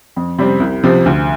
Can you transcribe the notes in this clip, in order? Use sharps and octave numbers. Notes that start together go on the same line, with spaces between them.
F2
C3 G3 C4
C2
C3 F3 C4
D2